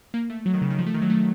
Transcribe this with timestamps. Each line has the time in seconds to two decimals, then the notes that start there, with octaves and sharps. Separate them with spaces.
0.14 A#3
0.30 A3
0.46 F#3
0.54 D#3
0.62 C#3
0.70 D#3
0.79 F3
0.86 A3
0.94 D#3
1.02 F#3
1.10 A3